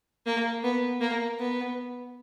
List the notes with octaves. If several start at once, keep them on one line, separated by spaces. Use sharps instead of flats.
A#3
B3
A#3
B3